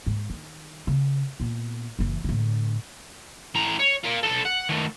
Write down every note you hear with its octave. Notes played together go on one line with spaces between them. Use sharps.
G#2
D#3
C#3
A#2 B3
F#1 E3
A2 D3
A2 A#5
C#5
F4 A#4
B1 A4
F#5
D#3 A3